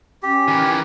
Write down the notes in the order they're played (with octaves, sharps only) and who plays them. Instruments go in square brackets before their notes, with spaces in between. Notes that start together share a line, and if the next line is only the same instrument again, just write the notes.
[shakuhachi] C#4 [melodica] G4
[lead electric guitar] D#3 E3